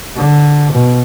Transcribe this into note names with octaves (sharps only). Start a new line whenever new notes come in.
D3
B2